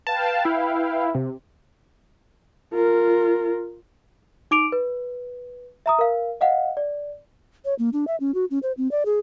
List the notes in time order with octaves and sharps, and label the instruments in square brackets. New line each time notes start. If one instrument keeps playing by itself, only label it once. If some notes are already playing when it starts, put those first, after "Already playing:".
[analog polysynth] B4 F5 G5 [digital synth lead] A5
[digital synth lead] E4
C3
[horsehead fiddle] F4 A#4
[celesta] D#4 D6 D7 F7
B4
E5 A#5 D#6
A#4 F5
D#5 F5 F#5
D5
[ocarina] C#5
A#3
D4
E5
C#4
F#4
C#4
C5
C4
D5
G#4